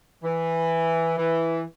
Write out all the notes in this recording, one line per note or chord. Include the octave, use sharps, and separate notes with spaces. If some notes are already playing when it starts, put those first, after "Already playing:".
E3
E3